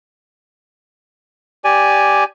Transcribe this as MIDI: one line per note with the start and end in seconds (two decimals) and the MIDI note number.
1.64 2.24 67
1.64 2.24 74
1.64 2.24 80